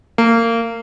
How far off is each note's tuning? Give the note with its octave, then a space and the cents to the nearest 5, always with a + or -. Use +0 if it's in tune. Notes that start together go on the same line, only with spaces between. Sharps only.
A#3 -25